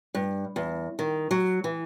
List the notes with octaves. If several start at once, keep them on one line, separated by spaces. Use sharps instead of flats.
G2
E2
D#3
F#3
E3